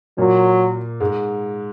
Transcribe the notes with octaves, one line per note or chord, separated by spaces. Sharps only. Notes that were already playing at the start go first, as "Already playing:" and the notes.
A#2 F#3 A#3
G#2 G#3